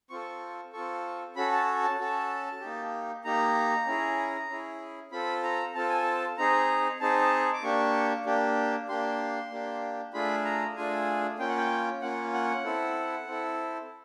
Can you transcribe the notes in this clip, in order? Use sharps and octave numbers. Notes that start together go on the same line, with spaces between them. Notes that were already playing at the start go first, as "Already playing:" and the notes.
C4 F4 A4 C#6
C4 F4 A4 C#6
C#4 F#4 A4 B5
A5
A5
C#4 F#4 A4
A#3 D#4 G4
A#3 D#4 G4 A#5
C#4 E4 G#4
C#4 E4 G#4
C4 F4 A4 B5
A#5
C4 F4 A4 A5
G#5
A5
C4 D#4 G#4 A#5
C4 D#4 G#4 A5
D6
A#3 D4 G4 C#6
A#3 D4 G4
A#3 D4 G4 C6
A#3 D4 G4
A3 D4 F4 G#4 B5
A#5
A3 D4 F4 G#4 G#5
A#3 C#4 F4 G5
F#5
G5
A#3 C#4 F4 F#5
F#5
C4 E4 A4
C4 E4 A4